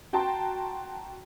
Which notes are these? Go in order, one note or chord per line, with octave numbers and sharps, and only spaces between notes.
F#4 G5 A5 A#5 C6